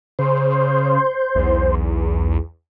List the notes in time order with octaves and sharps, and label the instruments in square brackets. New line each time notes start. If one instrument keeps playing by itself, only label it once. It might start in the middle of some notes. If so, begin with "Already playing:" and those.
[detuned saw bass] C#3 [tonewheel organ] C5
[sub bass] B1 [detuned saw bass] E2